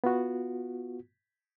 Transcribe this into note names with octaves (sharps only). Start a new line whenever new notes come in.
B3 F4 F#4